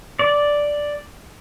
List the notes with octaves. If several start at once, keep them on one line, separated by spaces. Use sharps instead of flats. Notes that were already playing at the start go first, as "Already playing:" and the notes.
D5